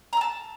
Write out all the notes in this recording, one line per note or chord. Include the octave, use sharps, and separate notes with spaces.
A5 A#5 E6